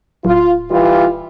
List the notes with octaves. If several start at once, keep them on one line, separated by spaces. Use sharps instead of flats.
D1 F4
E3 G3 F4